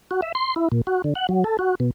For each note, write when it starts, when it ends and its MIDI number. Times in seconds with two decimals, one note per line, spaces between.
0.11 0.21 66
0.22 0.32 76
0.35 0.54 84
0.56 0.68 64
0.72 0.82 46
0.87 1.02 66
1.04 1.14 50
1.15 1.27 78
1.29 1.44 54
1.44 1.57 69
1.59 1.75 66
1.80 1.91 47